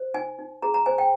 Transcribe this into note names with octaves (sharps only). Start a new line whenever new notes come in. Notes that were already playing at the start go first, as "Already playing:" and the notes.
Already playing: C5
D#4 G#5
D#4
G#4 A#5
A#5
C5 G#5
G5